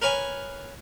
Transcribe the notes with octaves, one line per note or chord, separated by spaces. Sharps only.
A#4 B4 C#5 G#5